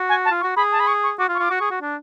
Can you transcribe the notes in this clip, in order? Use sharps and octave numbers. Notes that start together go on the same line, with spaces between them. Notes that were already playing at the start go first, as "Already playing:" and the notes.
Already playing: F#4
G#5
A5
F4
C#6
F#4
G#4 B5
A5
B5
C#6
C#6
F#4 D6
F4
C#6
F4 D6
F#4 C#6
G#4
F#4
D4